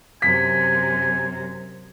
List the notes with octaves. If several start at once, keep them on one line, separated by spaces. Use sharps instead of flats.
F#2 C3 G#5 B6